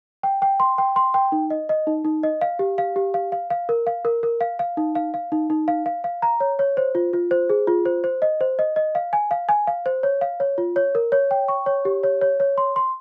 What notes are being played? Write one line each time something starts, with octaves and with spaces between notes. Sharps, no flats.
G5
G5
C6
G5
C6
G5
D#4
D#5
D#5
D#4
D#4
D#5
F5
G4
F5
G4
F5
F5
F5
A#4
F5
A#4
A#4
F5
F5
D#4
F5
F5
D#4
D#4
F5
F5
F5
A#5
C#5
C#5
C5
F4
F4
C5
G#4
F4
C5
C5
D#5
C5
D#5
D#5
F5
G#5
F5
G#5
F5
C5
C#5
F5
C#5
F4
C#5
A#4
C#5
G5
C#6
C#5
G4
C#5
C#5
C#5
C6
C6